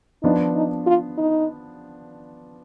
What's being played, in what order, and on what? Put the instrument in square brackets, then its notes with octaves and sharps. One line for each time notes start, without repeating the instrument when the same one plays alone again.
[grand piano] F3 B3 D4 [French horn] D#4
[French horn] D#4
F4
D#4